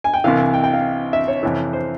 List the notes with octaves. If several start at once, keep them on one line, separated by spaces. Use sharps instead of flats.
G#5
G5
C2 C3 E3 F5
G#5
G5
G5
F5
E5
C#5
F2 C3 E3
C5